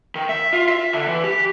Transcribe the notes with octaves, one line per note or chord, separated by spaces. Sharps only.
D#3
E5
F4
E5
D3
E3
G4